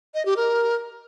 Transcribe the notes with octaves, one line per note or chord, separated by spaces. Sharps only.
D#5
G4
A#4